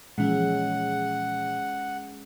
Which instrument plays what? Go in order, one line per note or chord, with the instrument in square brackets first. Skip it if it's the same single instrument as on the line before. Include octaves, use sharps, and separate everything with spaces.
[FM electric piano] A#2 E3 F3 [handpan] G#3 C#4 [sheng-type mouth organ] F#5